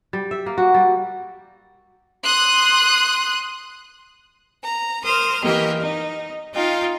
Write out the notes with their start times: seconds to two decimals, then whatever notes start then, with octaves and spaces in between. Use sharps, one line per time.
0.13 G3
0.31 E5
0.46 A#3
0.58 F#4
0.74 G3
2.24 C6 D#6 F#6
4.62 A#5
5.02 A#4 C5 D#6 F6
5.41 E3 A#3 G4 A#4 D#5 G5
5.78 D#4
6.53 D#4 F4 F5 G5